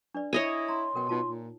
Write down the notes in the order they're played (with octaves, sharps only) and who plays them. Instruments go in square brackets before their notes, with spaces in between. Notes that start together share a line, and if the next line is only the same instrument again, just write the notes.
[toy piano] D4 B4 D5
[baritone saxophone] E4 [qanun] C#5 D#5 G#5
[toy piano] A#5 [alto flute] C6
[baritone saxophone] B2 [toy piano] A#4 G5
[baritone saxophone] B2 [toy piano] D#4 F4 A5
[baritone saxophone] A#2